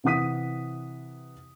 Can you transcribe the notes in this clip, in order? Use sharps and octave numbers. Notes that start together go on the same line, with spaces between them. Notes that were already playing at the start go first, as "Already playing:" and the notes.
C3 E3 F#5 D#6 B6 D#7